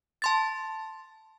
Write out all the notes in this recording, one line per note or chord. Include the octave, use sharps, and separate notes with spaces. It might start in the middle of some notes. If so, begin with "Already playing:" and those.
A5 C6 A6